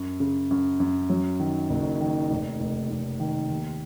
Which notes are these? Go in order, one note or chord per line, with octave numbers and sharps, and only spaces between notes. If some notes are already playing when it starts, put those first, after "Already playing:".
Already playing: F#2
C#3
F#2
F#2
F#3
D#3
F#1
D#3
F1
F1
F1
D#3
D#2